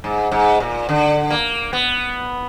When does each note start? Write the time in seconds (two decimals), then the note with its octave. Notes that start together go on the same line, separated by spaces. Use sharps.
0.04 G#2
0.32 G#2
0.60 A#2
0.89 D3
1.30 A#3
1.73 B3